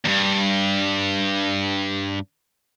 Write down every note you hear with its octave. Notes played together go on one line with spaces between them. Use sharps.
E2 G2